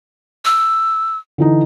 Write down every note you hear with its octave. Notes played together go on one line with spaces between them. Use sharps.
E6
D3 E3 D#4